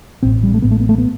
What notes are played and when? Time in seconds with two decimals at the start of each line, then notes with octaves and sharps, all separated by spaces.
0.23 A1 A2 C4
0.43 G3
0.54 A3
0.62 A1 A2 B3
0.71 A3
0.80 B3
0.89 A3
0.98 B3